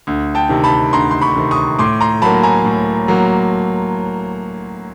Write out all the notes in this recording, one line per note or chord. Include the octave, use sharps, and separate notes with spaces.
D2
G5 A5
C3 D#3
A5 B5
D2 A#5 C6
C6
B5 C#6
C3 D#3
C#6 D#6
A2 C6 D6
A#5 C6
F#3 A#3 A5 B5
G#5 A#5
A2
F#3 A#3